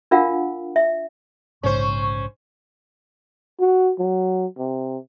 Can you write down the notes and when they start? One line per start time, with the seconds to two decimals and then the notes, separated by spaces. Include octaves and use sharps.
0.11 D4 F4 A#4 F5 F#5
0.76 E5
1.63 A#1 G#2 C#3 C#4 C5 C#6
3.59 F#4
3.99 F#3
4.58 C3